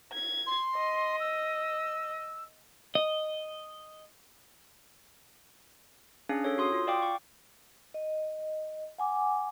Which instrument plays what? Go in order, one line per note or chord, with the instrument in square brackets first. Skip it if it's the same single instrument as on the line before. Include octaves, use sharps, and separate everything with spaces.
[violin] G#6
[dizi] C6
[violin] D#5
[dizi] E6
[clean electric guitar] D#5
[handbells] C#4 D4 G#4 F5
A4 C#5
F#4 C6 D#6
F4
D5 F5 G5 D6
C#6
[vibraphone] D#5
F#5 G#5 D6